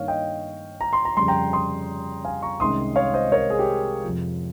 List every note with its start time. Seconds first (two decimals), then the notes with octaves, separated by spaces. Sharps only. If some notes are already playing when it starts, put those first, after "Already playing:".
Already playing: G2 D#3 A#3 C#5 F5
0.08 D#5 G5
0.81 A#5
0.93 C6
1.05 A#5
1.17 F2 C#3 G3 C6
1.28 G5 A#5
1.53 C6 D#6
2.25 F5 G#5
2.42 A#5 C#6
2.60 C2 C3 D#3 G#3 C#4 C6 D#6
2.96 C#5 F5
3.14 C5 D#5
3.32 A#4 C#5
3.50 G#4
3.59 G4
4.04 F2 C3 F3